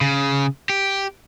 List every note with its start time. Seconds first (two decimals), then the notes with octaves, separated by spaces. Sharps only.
0.01 C#3
0.70 G4